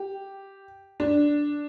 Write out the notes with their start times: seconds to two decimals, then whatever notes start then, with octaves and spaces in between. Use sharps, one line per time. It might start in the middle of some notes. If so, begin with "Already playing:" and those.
Already playing: G4
1.00 D4